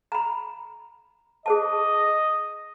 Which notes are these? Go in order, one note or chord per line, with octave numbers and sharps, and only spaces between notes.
A#5 B5
G#4 C5 D#5 A5